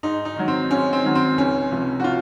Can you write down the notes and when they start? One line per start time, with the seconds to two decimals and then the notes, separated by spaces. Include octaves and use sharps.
0.03 G#2 D#4
0.25 D#4
0.36 D#3 F#3
0.48 C4
0.71 G#2 C#4
0.93 C4
1.04 D#3 F#3
1.15 C4
1.38 C#2 C#4
1.72 C3 F3
2.00 F#4
2.04 F4